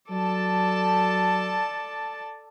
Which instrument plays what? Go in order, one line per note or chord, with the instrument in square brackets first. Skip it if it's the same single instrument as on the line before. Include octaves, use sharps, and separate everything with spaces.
[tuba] F#3 [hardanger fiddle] A4 [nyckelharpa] D5 A5